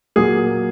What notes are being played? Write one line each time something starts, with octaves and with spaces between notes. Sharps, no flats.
A#2 F#3 A#3 G#4